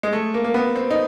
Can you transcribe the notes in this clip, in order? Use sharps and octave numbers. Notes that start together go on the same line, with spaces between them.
G#3
A3
A#3
A#3
B3
C4
D#4